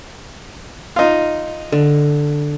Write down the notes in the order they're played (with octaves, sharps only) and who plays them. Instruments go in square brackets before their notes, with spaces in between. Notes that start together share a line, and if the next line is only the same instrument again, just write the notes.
[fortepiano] D#4 F4
[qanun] D3